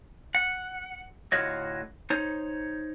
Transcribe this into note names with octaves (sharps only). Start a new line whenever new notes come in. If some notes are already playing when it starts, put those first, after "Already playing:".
F#5
A2 D3 F4 F#4 C#5 D#5
D#4 C5 C#5